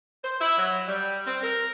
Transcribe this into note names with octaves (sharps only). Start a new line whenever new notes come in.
C5
E4
F#3
G3
C4
A#4